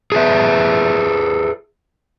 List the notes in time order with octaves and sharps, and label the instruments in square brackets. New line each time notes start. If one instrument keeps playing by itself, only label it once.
[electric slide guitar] G#4 A4 B4 E5